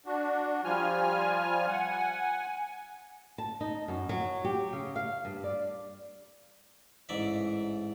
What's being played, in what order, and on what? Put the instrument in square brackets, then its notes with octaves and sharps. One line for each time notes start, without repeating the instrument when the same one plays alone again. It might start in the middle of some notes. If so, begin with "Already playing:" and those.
[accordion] D4 F#4
F3 G3 F4 G#5 F6
F#5 G#5
[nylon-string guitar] A5
D#4
F#2
F#3
G4
C#3
F5
G2
D5
[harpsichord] A1 G#2 D5 E5